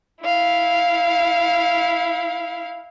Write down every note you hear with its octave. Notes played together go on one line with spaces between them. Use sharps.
E4 F5